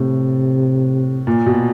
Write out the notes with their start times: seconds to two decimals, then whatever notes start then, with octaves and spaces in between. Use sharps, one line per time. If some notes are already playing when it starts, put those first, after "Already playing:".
Already playing: A2 C3
1.27 A#2
1.46 B2